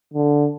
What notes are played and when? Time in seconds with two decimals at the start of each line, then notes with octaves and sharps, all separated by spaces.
0.14 D3